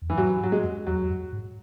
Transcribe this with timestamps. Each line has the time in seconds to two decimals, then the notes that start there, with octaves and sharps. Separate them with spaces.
0.02 E2
0.10 F#2 E3
0.17 G#2 F#3
0.40 G#2
0.44 F#3
0.52 G#3
0.64 F#2
0.87 E2 F#3
1.01 E2
1.10 F#2
1.32 G#2